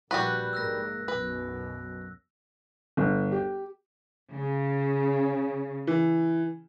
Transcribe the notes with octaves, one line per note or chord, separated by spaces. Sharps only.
A#1 G3 F#4 B4 F#6
G#2 A#3 E6 F#6 A#6
B1 F#2 B2 B4
G1
G4
C#3
E3